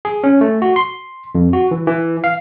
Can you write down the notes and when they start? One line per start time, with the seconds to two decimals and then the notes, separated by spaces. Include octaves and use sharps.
0.05 G#4
0.24 C#4
0.41 A3
0.62 F#4
0.76 C6
1.35 F2
1.53 F#4
1.71 E3
1.87 E3
2.24 F5